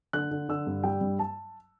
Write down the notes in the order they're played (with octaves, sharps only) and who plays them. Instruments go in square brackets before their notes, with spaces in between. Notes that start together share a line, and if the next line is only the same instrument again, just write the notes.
[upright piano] D3 F#6
D3
D3 E6
G2
G3 G5
G2
A5